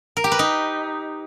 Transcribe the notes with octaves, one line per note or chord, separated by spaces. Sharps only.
A#4
G4
B4
D#4